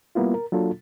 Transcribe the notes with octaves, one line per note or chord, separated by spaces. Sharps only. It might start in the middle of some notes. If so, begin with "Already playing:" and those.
G3 A#3 B3 E4 F4
A#4
F#3 A#3 D4 F4 A4